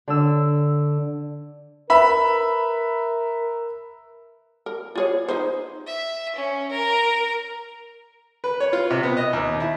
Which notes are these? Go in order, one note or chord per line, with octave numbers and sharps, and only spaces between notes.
D3 E6
A#4 B4 E5 B5
A#4
F4 G#4 C#5
D#4 G#4 C5
E5
C#4
A#4
B4
C#5
F4
C3
B3
D#5
D#2
E4